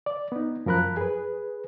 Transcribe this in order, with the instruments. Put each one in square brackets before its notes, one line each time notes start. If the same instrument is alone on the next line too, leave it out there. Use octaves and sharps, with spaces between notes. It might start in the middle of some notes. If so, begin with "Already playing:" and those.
[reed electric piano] D5
B3 D#4
F#2 F3 A#4 B5 F#6
G#4 B4